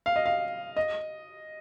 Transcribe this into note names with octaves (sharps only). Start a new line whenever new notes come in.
F5
D#5
F5
D#5